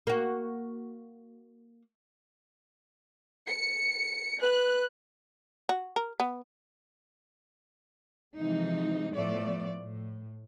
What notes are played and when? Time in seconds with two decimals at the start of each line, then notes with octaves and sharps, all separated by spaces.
0.07 A#3 F#4
3.48 C#7
4.42 B4 F#6
5.69 F#4
5.96 A#4
6.20 B3
8.36 C3 E3 F3 G#3 D#4
9.12 A2 F3 A3 B3 D5
9.81 A2